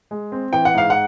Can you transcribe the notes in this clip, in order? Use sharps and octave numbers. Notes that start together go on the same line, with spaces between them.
G#3
C4
E3 G5
F#5
G#2 F5
F#5